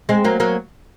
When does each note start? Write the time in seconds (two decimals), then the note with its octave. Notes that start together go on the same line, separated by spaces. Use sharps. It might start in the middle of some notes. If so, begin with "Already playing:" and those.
0.09 G#3 C4
0.24 F#3 A#3
0.40 F#3 A#3